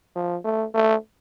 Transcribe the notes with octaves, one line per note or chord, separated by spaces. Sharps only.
F3
A3
A3